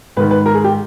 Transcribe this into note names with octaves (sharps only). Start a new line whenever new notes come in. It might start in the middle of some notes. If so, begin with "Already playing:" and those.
G#2 D#3 B4
B4
A#4
G#4
G4